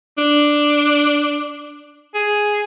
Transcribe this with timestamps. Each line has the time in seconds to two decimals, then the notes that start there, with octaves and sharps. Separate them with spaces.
0.18 D4
2.14 G#4